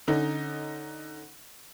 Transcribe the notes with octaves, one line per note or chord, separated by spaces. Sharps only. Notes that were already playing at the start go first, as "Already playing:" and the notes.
D3 C#4 D#4